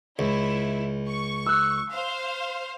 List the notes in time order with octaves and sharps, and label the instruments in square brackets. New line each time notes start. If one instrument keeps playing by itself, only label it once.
[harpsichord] C#2 [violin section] E4
[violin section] C#6
[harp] E6 F#6
[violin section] C5 F5